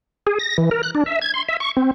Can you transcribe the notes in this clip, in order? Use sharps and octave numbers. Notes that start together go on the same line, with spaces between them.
G#4
A#6
E3
A#4
F#6
D4
E5
G#6
C6
E5
C#6
C4